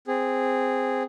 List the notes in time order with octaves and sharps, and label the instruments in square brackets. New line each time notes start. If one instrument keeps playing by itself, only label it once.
[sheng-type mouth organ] C4 G#4